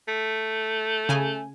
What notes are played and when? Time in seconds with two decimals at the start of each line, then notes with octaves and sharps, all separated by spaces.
0.08 A3
1.09 C#3 G#5